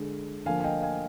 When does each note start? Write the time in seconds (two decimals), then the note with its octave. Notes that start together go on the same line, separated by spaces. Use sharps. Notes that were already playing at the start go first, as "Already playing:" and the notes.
Already playing: D3 G#3
0.46 D3 F3 A#3 F5 G#5
0.60 G#5
0.64 D#5 G5
0.83 F5 G#5